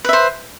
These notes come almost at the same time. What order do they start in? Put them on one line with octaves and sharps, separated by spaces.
B4 E5 C5